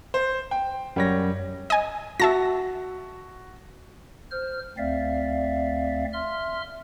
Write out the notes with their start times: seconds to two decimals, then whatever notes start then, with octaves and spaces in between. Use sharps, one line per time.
0.14 C5
0.51 G5
0.96 F#2 G3 C#5 A#6
1.70 D#5 G#5
2.20 F#4 E5 A5 A#6
4.31 C5 F6
4.78 D2 C4 D5 E5 F5
6.13 E5 C6 F6